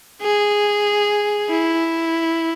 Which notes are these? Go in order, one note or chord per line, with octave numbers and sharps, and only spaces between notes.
G#4
E4